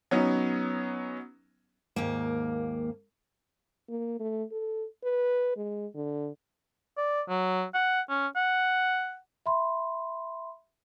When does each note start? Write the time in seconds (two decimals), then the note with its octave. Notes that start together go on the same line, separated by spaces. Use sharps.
0.11 F#3 B3 C#4 D#4
1.96 D#2 G#2 A#3
3.89 A#3
4.19 A3
4.52 A4
5.03 B4
5.57 G#3
5.95 D3
6.97 D5
7.29 F#3
7.74 F#5
8.10 C#4
8.36 F#5
9.46 E5 B5 C6